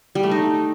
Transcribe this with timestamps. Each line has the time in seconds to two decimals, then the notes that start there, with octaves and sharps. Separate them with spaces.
0.15 G3
0.23 A3
0.31 D#4